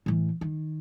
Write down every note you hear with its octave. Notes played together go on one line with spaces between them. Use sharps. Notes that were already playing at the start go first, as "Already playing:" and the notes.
A2 E3
D#3